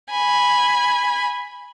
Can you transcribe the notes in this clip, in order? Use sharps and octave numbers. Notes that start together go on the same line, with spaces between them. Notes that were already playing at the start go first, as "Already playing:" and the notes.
G#5 B5